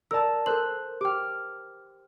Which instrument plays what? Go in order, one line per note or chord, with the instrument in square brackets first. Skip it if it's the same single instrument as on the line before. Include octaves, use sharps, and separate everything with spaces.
[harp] A#4 A5 [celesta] D5 E6
[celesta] A4 A#4 F#7 [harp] C5 E6 F#6
[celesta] G4 G5 [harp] D6 F6